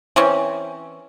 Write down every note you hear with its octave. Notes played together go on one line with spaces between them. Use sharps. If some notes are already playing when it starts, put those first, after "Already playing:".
E3 C4 C#4